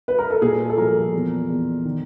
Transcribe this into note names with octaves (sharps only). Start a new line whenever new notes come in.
B4
A#4
A4
A#2 G#4
A4
F3 A#4
E2
E2
D#3